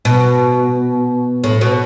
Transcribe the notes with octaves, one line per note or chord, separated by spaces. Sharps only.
B2
A2
B2